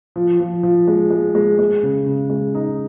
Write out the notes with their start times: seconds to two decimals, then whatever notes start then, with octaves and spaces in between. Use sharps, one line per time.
0.16 F3
0.40 F3
0.63 F3
0.88 G#3
1.10 G#3
1.35 G#3
1.59 G#3
1.83 C#3
2.06 C#3
2.30 G#3
2.55 D#4